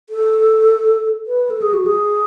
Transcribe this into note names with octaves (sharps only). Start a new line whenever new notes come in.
A4
B4
A4
G#4
F#4
G#4